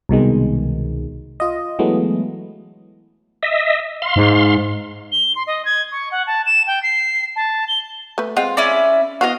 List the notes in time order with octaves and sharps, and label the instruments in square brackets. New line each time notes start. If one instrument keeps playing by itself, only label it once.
[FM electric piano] C2 B2 D#3 G#3
F4 D#5
E3 F#3 G#3 A3 B3
[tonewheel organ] D#5 E5
F5 C6
[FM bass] G#2
[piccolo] G7
C6
D#5
G#6
C#6
F#5
A5
E7
G5
C7
A5
G7
[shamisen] A3 B4
[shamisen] G#3 C4 F#5 [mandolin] F4
[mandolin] C#4 E4 D5
[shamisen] E3 B3 F#4 [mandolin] D#5 F5